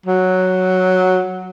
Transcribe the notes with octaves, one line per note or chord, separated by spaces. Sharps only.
F#3